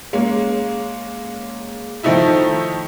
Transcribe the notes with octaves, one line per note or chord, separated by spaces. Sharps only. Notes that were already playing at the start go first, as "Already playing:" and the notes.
G#3 A#3 C#4
D#3 F3 A3 D#4 E4